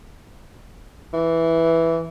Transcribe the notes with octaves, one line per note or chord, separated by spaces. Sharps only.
E3